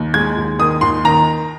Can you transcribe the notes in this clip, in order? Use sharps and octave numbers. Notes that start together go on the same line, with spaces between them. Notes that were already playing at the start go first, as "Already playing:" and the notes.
Already playing: D#2
G#3 G#6
D#2
D#3 D#6
D#2 C6
D#3 A#5